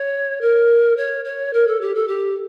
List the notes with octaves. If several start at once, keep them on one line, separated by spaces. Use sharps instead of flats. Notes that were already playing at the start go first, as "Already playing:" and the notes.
Already playing: C#5
A#4
C#5
C#5
A#4
A4
G4
A4
G4